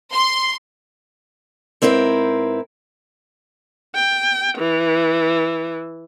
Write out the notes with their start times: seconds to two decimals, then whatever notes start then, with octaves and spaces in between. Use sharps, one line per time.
0.14 C6
1.82 G#2 C4 E4 A#4 B4
3.95 G5
4.58 E3